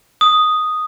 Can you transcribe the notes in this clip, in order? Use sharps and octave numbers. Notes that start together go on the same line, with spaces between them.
D#6